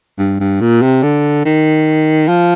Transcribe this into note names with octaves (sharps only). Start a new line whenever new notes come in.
G2
G2
A#2
C3
D3
D#3
F3